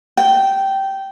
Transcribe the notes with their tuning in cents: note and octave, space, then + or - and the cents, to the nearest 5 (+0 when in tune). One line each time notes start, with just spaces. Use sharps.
G5 -10